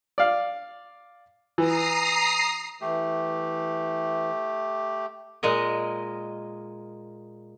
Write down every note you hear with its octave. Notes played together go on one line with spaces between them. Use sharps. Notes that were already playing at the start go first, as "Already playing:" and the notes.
D5 F5
E3 A#5 D#6 C7
E3 A3 G4
A#2 G#3 A#4 D#5